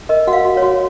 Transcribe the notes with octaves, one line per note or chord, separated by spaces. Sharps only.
A#4 D#5
F#4 F#5
F5
F#4
C#5
F#4